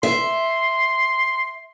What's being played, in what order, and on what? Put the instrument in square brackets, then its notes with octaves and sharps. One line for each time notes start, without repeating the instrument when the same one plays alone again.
[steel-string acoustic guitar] E5 [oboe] C6